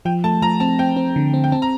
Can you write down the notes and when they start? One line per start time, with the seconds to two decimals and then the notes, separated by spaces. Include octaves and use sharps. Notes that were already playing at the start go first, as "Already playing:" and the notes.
0.05 F3 G5
0.24 A3 A5
0.42 F3 A#5
0.60 C4 A5
0.79 C4 G5
0.96 C4
1.16 D3
1.34 C4
1.44 G5
1.52 C4 A5
1.62 A#5